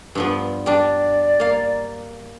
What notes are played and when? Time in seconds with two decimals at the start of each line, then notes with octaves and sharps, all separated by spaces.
0.15 G2 F3 B3
0.66 G3 D4 D5
1.40 A#3 F5